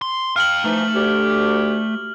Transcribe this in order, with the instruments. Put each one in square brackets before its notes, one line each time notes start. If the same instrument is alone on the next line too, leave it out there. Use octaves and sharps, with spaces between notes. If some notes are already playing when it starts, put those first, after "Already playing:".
[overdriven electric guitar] C6
[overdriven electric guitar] F5 G5 [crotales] F6 F#7
[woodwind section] E3 F3 D#4 [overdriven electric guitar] A3
[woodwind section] D2 G4